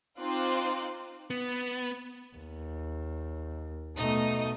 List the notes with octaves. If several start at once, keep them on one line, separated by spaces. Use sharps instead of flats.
C4 D#4 F4 C6 D6 F#6
B3
D#2
B2 A3 D#4 D#5